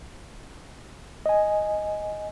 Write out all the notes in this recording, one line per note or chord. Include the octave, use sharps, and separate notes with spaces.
D#5 G#5